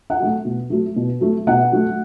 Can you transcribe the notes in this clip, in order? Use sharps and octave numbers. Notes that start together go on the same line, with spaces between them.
F#5
F#3 A3
B2
F#3 A3
B2
F#3 A3
B2 F#5
F#3 A3